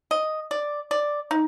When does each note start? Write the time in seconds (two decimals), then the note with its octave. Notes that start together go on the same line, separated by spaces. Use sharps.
0.11 D#5
0.51 D5
0.91 D5
1.31 D#4